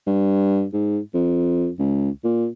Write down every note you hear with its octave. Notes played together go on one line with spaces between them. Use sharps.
G2
G#2
F2
C#2
A#2